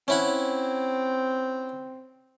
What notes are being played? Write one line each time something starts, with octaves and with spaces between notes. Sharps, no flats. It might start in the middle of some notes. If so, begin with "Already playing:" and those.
C4 C#4 E4 F#5